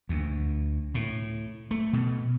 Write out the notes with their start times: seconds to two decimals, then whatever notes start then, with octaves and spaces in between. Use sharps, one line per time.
0.09 D2
0.94 A2
1.71 A3
1.93 B2